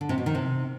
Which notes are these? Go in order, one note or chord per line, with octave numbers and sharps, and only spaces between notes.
D3
C3
B2
D#3
C3